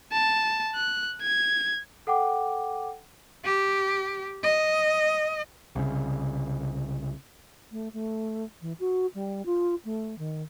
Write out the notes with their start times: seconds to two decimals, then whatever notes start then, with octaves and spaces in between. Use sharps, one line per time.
0.13 A5
0.75 F#6
1.22 G#6
2.07 A4 F#5 G5 D6
3.44 G4
4.43 D#5
5.75 C2 C#3
7.72 A3
7.93 A3
8.61 E3
8.80 F#4
9.15 G3
9.46 F4
9.85 A3
10.18 D#3